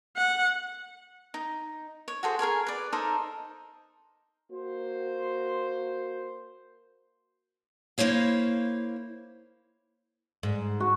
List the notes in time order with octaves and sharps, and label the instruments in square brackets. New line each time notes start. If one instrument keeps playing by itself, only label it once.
[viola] F#5
[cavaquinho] D#4
C#5
F#4 G#4 A4 C5
G#4 A#4 C#5 G#5
B4 D5
D#4 A4 A#4 C5
[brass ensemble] A#3 F#4 C5
[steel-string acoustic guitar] A#3 E4 C5 C#5 F5
[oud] G#2
[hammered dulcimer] F#4